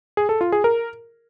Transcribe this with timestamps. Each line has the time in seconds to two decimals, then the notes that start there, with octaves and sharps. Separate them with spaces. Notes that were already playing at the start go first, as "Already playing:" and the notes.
0.17 G#4
0.29 A4
0.41 F4
0.52 G#4
0.64 A#4